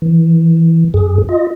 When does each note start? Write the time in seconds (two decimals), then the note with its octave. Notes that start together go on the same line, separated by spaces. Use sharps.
0.02 E3
0.94 F#2 G#4
1.29 F4 D#5